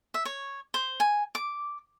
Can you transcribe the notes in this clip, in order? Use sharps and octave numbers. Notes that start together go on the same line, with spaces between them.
E5
C#5
C5
G#5
D6